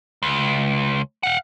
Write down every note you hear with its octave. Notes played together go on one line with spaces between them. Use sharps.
C#2
F5 F#5